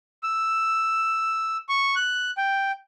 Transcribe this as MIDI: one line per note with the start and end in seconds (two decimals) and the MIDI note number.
0.23 1.57 88
1.69 1.95 85
1.96 2.31 90
2.37 2.72 79